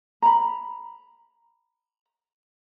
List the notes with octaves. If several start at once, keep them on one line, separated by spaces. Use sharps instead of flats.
A#5 B5